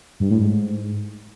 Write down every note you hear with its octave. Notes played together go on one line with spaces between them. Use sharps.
G2
A2
G#2